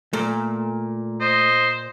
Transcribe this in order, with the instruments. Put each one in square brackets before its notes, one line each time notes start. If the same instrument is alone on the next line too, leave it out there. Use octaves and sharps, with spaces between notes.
[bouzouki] A#2 [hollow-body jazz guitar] A3
[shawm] C5 [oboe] D#5